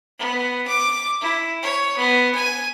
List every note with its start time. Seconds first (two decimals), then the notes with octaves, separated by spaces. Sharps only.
0.19 B3
0.68 D6
1.22 E4
1.63 C#5
1.97 B3
2.35 G#5